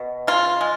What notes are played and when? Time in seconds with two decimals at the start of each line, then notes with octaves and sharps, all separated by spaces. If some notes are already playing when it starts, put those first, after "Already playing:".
Already playing: B2
0.27 C#3 F4
0.61 G#3